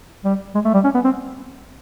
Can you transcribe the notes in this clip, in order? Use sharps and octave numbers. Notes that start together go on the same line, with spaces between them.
G3
G#3
A3
G3
C#4
B3
C4